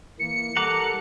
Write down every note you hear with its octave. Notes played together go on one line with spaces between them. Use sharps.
E3 A#3 C#7
G3 A4 A#4 F#5 A#5 D6